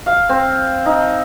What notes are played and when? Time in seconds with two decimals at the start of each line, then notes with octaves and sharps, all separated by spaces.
0.06 F5
0.29 C4
0.86 D#4